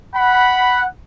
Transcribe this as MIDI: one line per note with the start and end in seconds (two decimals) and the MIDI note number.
0.14 0.85 78
0.14 0.85 83